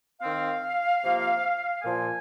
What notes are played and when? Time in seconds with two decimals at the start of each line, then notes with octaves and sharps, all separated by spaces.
0.22 D#3 C4 F5
1.02 C3 F3 A#3
1.81 A#2 F3 A#3 G#5